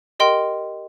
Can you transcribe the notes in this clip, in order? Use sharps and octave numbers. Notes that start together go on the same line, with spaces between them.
G4 A#4 D#5 G5 C6